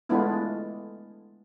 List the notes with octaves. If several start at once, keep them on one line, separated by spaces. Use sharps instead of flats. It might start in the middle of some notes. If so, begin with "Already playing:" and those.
G#3 A3 B3 D4 E4 F4